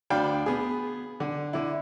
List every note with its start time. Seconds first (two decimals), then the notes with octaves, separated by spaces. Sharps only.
0.10 D2 D4 F5 G5 B5
0.46 B3 G#4
1.20 D3
1.53 D3 E4